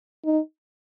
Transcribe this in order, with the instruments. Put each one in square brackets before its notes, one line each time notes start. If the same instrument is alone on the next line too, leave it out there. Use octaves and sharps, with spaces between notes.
[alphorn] D#4